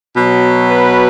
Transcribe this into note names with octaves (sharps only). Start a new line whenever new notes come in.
B2 F#3
B4